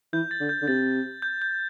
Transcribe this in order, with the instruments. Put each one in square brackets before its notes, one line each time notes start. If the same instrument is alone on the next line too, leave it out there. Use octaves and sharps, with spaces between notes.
[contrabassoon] E3 [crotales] G6
[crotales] A6
[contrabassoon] D3
[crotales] G6
[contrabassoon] D3
[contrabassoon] C3 [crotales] A6
[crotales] G6
G6